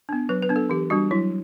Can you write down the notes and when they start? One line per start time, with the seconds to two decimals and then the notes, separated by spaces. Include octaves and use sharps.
0.09 B3 D4
0.29 F#3 B4
0.42 B4
0.49 B3 D4
0.56 A4
0.70 E3 G4
0.90 G3 D4 F#4
1.11 F#3 E4